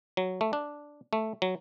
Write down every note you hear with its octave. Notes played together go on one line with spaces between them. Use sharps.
F#3
A3
D4
A3
F#3